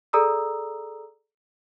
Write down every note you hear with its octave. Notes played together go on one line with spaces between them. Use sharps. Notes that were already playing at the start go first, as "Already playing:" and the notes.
G#4 A4 D5 A#5 D#6 E6